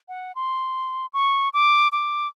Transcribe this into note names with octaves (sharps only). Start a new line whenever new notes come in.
F#5
C6
C#6
D6
D6